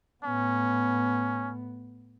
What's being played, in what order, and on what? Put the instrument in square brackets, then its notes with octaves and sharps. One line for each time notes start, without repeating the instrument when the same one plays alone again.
[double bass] A2 B3 [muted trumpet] C#4